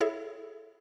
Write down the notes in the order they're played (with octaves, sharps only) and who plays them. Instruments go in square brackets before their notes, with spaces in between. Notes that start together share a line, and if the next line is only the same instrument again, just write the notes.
[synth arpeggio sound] E4 G#4 A4 C#5 E5